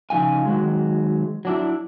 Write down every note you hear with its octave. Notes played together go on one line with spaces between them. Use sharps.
C#3 F3 D#4 F5 G#5
D#3 F#3 G#3
F#3 D4 E4